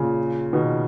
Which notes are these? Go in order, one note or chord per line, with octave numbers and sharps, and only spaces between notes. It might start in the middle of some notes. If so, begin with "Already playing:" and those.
Already playing: A#2 C#3
B2 D#3